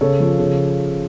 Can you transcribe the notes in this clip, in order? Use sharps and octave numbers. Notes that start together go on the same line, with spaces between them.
C#3 A4 C#5
F3
C#3